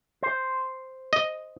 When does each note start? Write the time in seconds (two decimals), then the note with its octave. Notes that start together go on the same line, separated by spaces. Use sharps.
0.23 C5
1.13 D#5